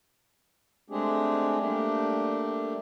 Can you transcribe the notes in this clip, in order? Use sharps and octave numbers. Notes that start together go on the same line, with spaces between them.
G#3 A3 C4 D4 G4 G#4
G3 A3 A#3 D4 G4